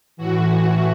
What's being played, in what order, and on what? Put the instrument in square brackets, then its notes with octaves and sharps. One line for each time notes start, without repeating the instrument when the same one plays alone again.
[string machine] A2 E3 F#4